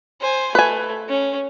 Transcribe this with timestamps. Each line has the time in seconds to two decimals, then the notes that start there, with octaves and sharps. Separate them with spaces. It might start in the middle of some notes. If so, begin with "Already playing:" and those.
0.21 C5 G#5
0.55 A3 B4 G#5
1.09 C#4